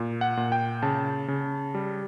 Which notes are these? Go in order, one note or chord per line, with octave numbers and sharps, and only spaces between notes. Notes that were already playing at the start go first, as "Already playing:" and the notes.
Already playing: A#2
F#5
A#2
G5
C#3 A5
C#3
G3